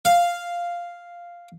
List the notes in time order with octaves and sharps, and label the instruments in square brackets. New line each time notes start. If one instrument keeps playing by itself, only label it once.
[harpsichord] F5